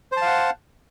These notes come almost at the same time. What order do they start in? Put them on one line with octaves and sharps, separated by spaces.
C5 A5 F5 F#5